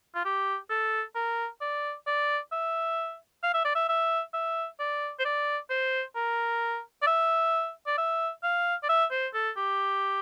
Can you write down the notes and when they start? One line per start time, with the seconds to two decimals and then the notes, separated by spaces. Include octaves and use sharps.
0.15 F4
0.25 G4
0.70 A4
1.15 A#4
1.61 D5
2.07 D5
2.52 E5
3.43 F5
3.54 E5
3.65 D5
3.75 E5
3.89 E5
4.34 E5
4.79 D5
5.20 C5
5.25 D5
5.70 C5
6.16 A#4
7.02 D5
7.07 E5
7.87 D5
7.98 E5
8.43 F5
8.83 D5
8.89 E5
9.11 C5
9.34 A4
9.57 G4